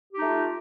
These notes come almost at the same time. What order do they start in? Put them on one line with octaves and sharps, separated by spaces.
G4 D#4 A3 F4